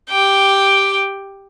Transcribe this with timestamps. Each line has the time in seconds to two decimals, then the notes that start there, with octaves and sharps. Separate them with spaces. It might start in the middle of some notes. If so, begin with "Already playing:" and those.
0.10 G4 G5